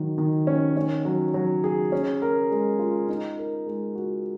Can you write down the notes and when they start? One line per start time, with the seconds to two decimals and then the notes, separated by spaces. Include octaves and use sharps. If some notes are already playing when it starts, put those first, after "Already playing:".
Already playing: D#3 F#3
0.18 D#3
0.47 C#4
0.77 C#4
1.05 F#3
1.34 F#3
1.64 G#4
1.92 C#4
2.22 A#4
2.51 G#3
2.79 F4
3.08 D#4
3.38 A#4
3.66 G#3
3.95 F#4